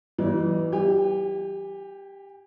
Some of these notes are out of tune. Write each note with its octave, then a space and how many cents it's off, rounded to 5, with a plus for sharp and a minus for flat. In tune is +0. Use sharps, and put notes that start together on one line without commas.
E3 +0 G3 -45 D#5 -25
G4 +5 G#5 -35